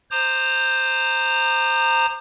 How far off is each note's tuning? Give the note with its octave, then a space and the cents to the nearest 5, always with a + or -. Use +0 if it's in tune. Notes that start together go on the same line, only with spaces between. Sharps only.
C5 +0 A#5 -15 D6 +45